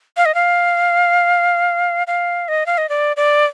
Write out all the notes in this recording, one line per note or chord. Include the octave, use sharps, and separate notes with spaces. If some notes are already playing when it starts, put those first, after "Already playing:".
F5
D#5
F5
F5
D#5
F5
D#5
D5
D5